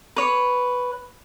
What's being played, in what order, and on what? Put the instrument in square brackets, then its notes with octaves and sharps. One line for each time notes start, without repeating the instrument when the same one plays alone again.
[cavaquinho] B4 C#5